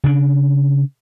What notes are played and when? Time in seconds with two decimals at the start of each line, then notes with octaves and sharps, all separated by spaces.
0.04 C#3 D4